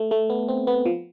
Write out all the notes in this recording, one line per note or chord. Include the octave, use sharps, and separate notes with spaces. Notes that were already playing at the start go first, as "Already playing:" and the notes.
Already playing: A3
A3
B3
C4
B3
F3